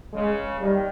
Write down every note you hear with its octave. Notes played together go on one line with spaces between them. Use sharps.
C#2 C#3 G#3
D#2 D#3 G3